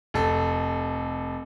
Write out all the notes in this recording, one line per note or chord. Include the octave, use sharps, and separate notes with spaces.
F1 A4